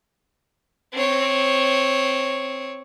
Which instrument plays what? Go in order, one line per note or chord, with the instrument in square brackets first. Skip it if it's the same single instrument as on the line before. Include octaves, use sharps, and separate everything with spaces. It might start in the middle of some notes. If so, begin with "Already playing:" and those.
[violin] C4 C#5